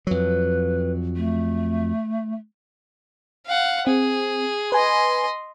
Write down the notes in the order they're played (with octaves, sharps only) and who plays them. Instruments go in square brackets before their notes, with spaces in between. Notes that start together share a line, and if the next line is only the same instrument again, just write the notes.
[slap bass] F2 F#3 [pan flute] B4
[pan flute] A3
[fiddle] F5 F#5
[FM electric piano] C4 [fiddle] G#4
[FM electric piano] B4 G#5 [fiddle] D#5 C6